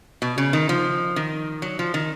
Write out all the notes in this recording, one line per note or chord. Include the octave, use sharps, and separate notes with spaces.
B2
C#3
D#3
F3
D#3
F#3
F3
D#3